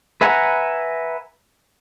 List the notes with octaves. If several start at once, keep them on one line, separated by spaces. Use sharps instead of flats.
B4 E5 F#5 G#5 A#5